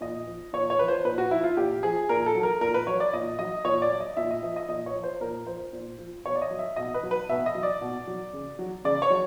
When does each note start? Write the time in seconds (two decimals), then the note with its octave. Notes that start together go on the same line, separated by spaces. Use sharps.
0.01 A#2 D#5
0.27 F3
0.53 A#2 C#5
0.70 C#5
0.79 F3 B4
0.88 C5
1.05 A#2 B4
1.18 F#4
1.31 F3 E4
1.44 F4
1.57 A#2 G4
1.83 F3 G#4
2.09 A#2 A#4
2.26 A4
2.35 F#3
2.43 A#4
2.61 A#2 A#4
2.74 B4
2.87 F#3 C#5
3.00 D5
3.13 A#2 D#5
3.39 F#3 D#5
3.64 A#2 C#5
3.82 D5
3.91 F#3
4.00 D#5
4.17 A#2 E5
4.31 D#5
4.43 F3 E5
4.56 D#5
4.68 A#2 D#5
4.86 C#5
4.96 F3
5.03 C5
5.21 A#2 A#4
5.47 F3 C5
5.73 A#2
5.99 F3
6.25 B2 C#5
6.36 D5
6.42 D#5
6.51 F#3
6.59 E5
6.76 B2 D#5
6.94 B4
7.03 F#3
7.11 B4
7.29 B2 E5
7.46 D#5
7.55 F#3
7.63 D5
7.81 B2
8.07 F#3
8.33 C#3
8.59 F#3
8.84 C#3 D5
9.02 C#5
9.10 F#3